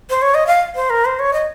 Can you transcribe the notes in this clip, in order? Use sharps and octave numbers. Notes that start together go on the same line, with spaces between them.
C5
C#5
D#5
F5
C5
A#4
C5
C#5
D#5